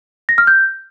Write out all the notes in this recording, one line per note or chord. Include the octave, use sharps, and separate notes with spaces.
A#6
F6
G6